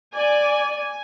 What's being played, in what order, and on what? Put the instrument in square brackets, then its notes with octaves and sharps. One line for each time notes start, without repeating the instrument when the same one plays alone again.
[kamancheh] D5 [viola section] G#5